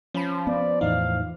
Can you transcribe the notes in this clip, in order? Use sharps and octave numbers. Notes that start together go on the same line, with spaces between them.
F3 C#4 B5
B3 D5
E2 A2 E3 D#4 F5